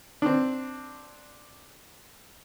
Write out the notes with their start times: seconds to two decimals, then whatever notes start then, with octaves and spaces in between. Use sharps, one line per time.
0.22 C4 D4